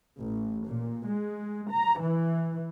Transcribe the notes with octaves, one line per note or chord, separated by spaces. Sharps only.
A1
A#2
G#3
A#5
E3